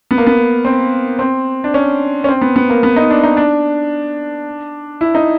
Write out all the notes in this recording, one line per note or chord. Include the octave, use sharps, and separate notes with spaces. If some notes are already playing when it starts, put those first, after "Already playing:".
B3
A#3
B3
C4
C4
D4
C#4
C#4
C4
B3
B3
A#3
B3
D#4
D4
D#4
D4
E4
D#4